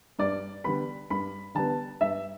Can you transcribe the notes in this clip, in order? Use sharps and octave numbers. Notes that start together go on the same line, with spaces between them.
G2 D5
D3 G3 B3 B5
G2 B5
D3 G3 B3 A5
G2 E5